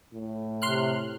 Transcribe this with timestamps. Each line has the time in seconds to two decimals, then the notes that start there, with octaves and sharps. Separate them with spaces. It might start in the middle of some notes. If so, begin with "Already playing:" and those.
0.13 A2
0.62 C3 C6 F6 F#6